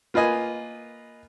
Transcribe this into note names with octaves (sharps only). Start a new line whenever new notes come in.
A#3 F4 B4 D#5 G#5